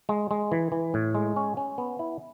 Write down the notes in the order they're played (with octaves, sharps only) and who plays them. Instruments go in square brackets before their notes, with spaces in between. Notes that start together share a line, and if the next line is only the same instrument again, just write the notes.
[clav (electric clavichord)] G#3
G#3
E3
E3
A2
G#3
C#4
C#4
B3
E4